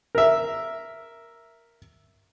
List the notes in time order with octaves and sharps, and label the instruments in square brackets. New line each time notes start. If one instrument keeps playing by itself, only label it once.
[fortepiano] A#4 E5